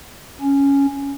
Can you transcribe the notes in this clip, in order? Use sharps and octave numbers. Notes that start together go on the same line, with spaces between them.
C#4